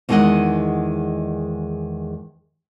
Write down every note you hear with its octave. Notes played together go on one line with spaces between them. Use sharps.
E2 D#3 G#3 A4 D#5 F#5